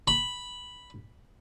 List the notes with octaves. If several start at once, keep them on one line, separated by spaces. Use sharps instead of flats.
B5